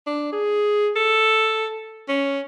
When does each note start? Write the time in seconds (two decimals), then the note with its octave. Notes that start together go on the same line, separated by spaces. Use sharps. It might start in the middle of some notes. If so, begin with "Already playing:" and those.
0.06 D4
0.32 G#4
0.96 A4
2.09 C#4